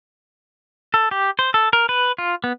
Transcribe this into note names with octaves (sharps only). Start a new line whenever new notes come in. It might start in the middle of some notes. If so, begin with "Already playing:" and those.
A4
G4
C5
A4
A#4
B4
F4
B3